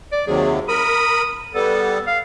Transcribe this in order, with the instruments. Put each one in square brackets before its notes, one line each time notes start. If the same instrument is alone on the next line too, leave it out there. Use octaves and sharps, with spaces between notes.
[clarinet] D5
[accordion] D#2 C3 F#3 [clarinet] G#4
[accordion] A#4 B5 [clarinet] D#6
[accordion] G3 B3 [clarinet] A4
[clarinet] F5